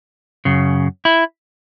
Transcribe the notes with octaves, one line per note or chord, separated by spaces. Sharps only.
F#2 C#3
E4